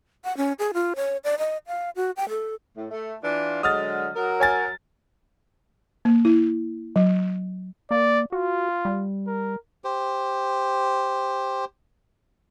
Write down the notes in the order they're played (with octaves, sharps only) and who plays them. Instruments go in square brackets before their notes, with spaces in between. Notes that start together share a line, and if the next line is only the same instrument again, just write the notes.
[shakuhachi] F#5
C#4
G#4
F4
C#5
D5
D#5
F5
F#4
G5
A4
[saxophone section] A2
A3
E3 D4 F4
[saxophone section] D3 F#3 G#3 [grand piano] D#6 F6 A6
[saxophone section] F#3 A#4
[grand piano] C#5 G#5 A6
[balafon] A#3
E4
F#3
[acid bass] A#3 [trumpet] D5
[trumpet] F4 [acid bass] F#4
[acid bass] G3
[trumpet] A#4
[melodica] G4 C5